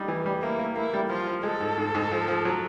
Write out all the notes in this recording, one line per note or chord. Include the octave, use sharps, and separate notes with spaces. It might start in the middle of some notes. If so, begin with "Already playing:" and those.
Already playing: G3 D#4
E3
G3
A#3 E4
A#3
A#3 E4
G3
F3 F4
F3
G#3 A4
G#2
G#2
G#2
F3
F3
F#3